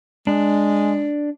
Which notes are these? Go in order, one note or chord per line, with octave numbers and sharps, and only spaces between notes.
G#3 D4